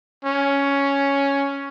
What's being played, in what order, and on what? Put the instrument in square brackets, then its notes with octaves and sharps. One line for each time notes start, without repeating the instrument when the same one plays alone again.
[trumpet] C#4